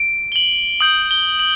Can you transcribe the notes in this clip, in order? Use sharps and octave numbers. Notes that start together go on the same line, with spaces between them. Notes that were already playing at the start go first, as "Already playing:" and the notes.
Already playing: D7
G7
F#7
D#6 G6 F#7
G7
F#7